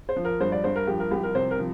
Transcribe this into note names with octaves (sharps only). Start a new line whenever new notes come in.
C5
F3
A#4
G2 C5
D5
G2 C5
A#4
F3 G4
A#4
C2 G4
A#4
C3 C5
A#4
F3